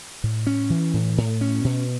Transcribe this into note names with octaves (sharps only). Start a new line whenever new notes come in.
A2
C#4
E3
A2
A2
C#4
B2